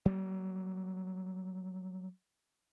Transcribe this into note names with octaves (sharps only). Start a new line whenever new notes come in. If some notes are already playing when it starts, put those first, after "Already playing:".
F#3 G3 A#3